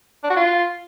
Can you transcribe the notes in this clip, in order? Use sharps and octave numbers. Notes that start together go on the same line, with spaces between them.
D4
F#4
F4